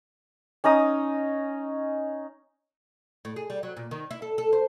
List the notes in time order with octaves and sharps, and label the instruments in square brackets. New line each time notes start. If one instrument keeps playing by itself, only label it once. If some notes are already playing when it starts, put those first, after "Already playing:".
[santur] C#4 D#4 A#5 D#6
[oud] A2
G#4
G3
F#3
A#2
D#3
E4
A4
A4
C5